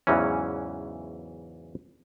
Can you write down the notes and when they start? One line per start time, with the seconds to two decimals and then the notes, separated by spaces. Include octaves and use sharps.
0.07 E2 G#2 C#3 E3 F#3 C#4